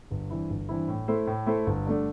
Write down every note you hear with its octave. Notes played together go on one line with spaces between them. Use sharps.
G1
G2 E3 C4 E4
G1
G2 E3 C4 E4
A2
A3 E4 A4 C5
A2
A3 E4 A4 C5
G1
G2 D3 A3 D4